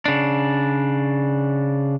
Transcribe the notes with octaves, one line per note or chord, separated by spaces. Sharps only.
C#3 D4